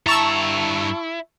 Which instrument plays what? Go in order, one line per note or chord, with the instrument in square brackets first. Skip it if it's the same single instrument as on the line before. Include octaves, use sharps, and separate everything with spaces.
[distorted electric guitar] G2 A#5 [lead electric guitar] E4 [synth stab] A5 C#6 E6